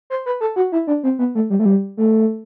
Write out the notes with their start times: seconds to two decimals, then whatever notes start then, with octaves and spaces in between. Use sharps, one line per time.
0.10 C5
0.26 B4
0.41 A4
0.56 F#4
0.72 E4
0.87 D4
1.03 C4
1.19 B3
1.35 A3
1.50 G3
1.59 A3
1.66 G3
1.97 A3